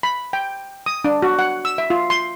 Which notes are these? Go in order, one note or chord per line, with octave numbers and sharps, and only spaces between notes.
B5
G5
D#6
D4
F#4
F#5
E6
E5
F4
C6